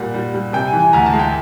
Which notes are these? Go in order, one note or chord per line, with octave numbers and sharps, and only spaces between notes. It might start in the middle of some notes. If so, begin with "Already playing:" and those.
Already playing: A#2 G3 F#5
G3
G3
C3 G5
G#5
E3
G#5
D2 A#5
A5
G#3
G5